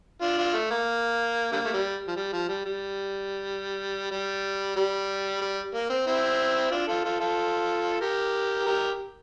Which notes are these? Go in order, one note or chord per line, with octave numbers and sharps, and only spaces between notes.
D4 F4
D4 F4
A3
A#3
D3 G3 A#3
A3
G3
F3
G3
F3
G3
G3
G3
G3
G3
A#3
C4
C4 E4
D4 F4
F4 A4
F4 A4
F4 A4
G4 A#4
G4 A#4